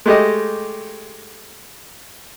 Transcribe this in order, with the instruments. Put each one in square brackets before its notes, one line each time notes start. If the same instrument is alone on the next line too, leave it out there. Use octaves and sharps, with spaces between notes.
[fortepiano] G#3 A3 G4 D#5